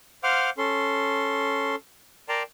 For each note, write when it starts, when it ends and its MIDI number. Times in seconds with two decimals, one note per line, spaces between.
0.24 0.50 72
0.24 0.50 77
0.24 0.50 78
0.24 0.50 84
0.24 0.50 86
0.24 0.50 89
0.58 1.75 61
0.58 1.75 69
0.58 1.75 84
2.29 2.43 70
2.29 2.43 74
2.29 2.43 79
2.29 2.43 81
2.29 2.43 82
2.29 2.43 84